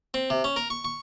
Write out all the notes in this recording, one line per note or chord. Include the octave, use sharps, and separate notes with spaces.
C4
C3
C#4
A#4
C#6
C#6